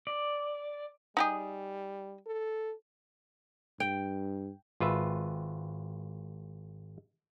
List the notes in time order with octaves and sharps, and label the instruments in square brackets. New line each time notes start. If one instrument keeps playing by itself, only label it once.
[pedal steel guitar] D5
[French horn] G3 [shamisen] D#4 G4 G#4
[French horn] A4
[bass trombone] G2 [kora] G5
[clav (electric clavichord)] G#1 F4 B4 E5